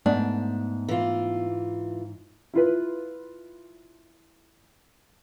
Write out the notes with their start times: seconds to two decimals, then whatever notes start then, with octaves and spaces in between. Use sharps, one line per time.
0.06 G#2 A3 B3 D4
0.89 E3 F4
2.54 E4 F4 B4